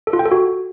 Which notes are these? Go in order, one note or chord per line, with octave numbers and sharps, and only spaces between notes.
A4
F4
G5
A4
F#4